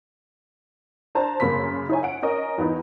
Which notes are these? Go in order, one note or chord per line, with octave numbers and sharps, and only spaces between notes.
D4 C5 A5 A#5
F#2 C#3 A#3 B5 C6 B6
D#4 E4 C#5 G#5
F#5 D7
C#4 A#4 D#5
E2 B3 D#4